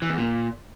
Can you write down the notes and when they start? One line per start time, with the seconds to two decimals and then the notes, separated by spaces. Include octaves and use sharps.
0.02 E3
0.10 E2
0.18 A#2